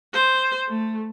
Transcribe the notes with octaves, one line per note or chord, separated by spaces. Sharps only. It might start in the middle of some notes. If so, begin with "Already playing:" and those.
C5
A3